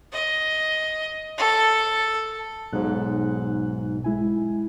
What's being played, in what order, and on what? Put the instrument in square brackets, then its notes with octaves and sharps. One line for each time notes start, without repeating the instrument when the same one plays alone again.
[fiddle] D#5
A4
[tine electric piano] B1 G#2 [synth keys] F#6
[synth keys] G#3 E4 G#5